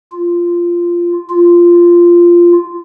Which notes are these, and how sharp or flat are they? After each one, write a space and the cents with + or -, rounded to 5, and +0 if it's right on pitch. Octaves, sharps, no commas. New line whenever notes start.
F4 -10
F4 -10